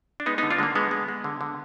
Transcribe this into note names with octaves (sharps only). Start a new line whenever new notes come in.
D4
G#3 B3 D#4
D3 B3 D#4
D4 F4
D3 G#3 A#3
D3 G#3 B3
G#3
G#3
D3
D3